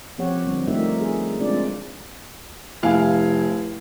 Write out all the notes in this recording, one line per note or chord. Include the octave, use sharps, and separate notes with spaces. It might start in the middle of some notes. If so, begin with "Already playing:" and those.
F3 C4 G4 C#5 F#5
D3 G3 C4
A3 D#4 F4 G4 A#4 E5
G#4
G#3 C4 D4 F4 D5
F1 E4 F5 G#5